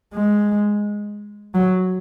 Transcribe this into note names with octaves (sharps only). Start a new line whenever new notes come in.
G#3
F#3